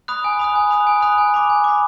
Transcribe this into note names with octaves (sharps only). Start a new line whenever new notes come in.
B5 D#6 F#6
G#5
B5 D#6 F#6
G#5
B5 D#6 F#6
G#5
B5 D#6 F#6
G#5
B5 D6
G#5
B5 D6